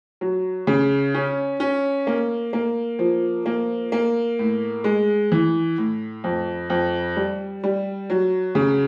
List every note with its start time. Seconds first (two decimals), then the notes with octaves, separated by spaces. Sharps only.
0.21 F#3
0.67 C#3
1.14 C#4
1.60 C#4
2.07 A#3
2.53 A#3
2.99 F3
3.46 A#3
3.92 A#3
4.39 A2
4.84 G#3
5.32 E3
5.78 A2
6.24 F2
6.70 F2
7.16 G3
7.64 G3
8.10 F#3
8.55 C#3